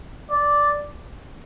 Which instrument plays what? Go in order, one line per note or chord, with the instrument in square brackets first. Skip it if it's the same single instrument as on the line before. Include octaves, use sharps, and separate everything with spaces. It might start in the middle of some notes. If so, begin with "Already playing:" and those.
[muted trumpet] D5